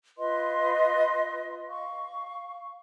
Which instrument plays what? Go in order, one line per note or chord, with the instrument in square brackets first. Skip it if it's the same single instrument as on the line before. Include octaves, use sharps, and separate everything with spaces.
[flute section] F4 B4 D#5 C6
F5 C#6